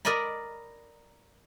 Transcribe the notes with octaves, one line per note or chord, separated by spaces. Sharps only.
A#4 D5 D#5 A#5 B5